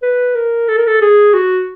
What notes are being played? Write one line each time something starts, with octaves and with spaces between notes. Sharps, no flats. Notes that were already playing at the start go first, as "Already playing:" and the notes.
B4
A#4
A4
A#4
A4
G#4
F#4